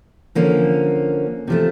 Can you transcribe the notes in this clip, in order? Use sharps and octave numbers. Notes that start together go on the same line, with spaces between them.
D3 F3 A#3 C#4
C3 F3 A3